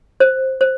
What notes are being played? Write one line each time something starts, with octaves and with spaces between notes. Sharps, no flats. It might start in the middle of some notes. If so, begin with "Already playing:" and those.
C5
C5